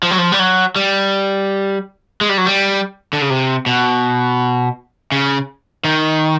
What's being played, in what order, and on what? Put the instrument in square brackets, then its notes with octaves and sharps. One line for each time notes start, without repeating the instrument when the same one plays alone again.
[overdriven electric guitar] F3
F#3
F3
G3
F#3
G3
G#3
G3
F#3
G3
D3
C#3
C3
B2
C#3
D#3